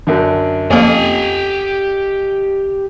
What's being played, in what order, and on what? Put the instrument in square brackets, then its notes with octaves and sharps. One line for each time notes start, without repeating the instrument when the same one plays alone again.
[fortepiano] F#2 D3
[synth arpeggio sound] F2 A#3 [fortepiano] C#4 A4 D#5 [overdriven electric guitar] G4 G#5